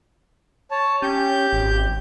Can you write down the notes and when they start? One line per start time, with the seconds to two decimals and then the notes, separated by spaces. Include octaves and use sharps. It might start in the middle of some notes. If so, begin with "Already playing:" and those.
0.71 C#5 A5
1.02 C#4 G4 G6
1.53 G#1